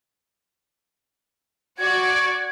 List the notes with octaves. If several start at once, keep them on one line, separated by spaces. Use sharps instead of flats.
F#4 D5 G#6